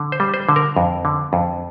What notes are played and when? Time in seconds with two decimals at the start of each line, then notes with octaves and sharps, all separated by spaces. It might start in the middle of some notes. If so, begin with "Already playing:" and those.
Already playing: D3
0.12 C5
0.20 G3
0.34 C5
0.49 D3
0.56 A#4
0.77 F2
1.05 D3
1.33 F2